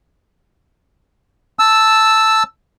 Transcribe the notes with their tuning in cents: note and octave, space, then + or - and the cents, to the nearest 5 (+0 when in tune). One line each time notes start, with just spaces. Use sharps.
A5 +0 E6 +0